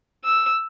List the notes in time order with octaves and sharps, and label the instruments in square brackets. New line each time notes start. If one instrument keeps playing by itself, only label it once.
[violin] E6